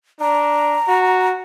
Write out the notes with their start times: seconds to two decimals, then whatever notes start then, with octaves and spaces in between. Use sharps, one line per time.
0.20 D4 A#5
0.88 F#4